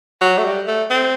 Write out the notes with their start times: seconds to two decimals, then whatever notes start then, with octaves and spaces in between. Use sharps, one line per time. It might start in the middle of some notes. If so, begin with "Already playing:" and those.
0.21 F#3
0.38 A3
0.45 G3
0.68 A3
0.90 C4